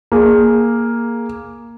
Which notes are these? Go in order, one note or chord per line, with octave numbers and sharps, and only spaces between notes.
A#3 G#4